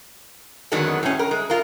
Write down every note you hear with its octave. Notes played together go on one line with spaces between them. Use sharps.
F2 D3 D#3 F#3 G#3 B3
A2 C#4
A#4
G#3
F4 A#4